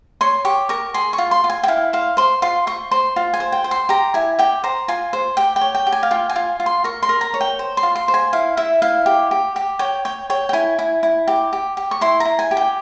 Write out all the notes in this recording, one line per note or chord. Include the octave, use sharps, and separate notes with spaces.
C#5 C6
G4 C#6
A#4 C#6
G#4 C6
C#6
F4
C6
F4
G#5
G5
E4 F5
C5 F5
C5 C6
F4 C6
C5 C#6
C5 C6
F4
G#5
C5
G5
C5
C6
G4 A#5
E4 G#5
G4 G5
C5 A#5
F4 G#5
C5
G4 G5
G5
C#5
G5
G4
G#5
F5
F4 G5
G#5
F4
F4
C6
A#4 C#6
C6
A#4
A#5
C#5
G5
C5
C6
F4
C6
C5
G#5
E4 F5
E4 E5
E4 F5
G4
G4
G4
C#5 G5
C#5 G5
C#5 G5
G5
E4 G#5
E4
E4
G4
G4
G4
C#6
E4 C6
A#5
E4
G#5
G4
G5